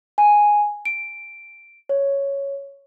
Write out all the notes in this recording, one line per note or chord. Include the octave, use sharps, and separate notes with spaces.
G#5
D7
C#5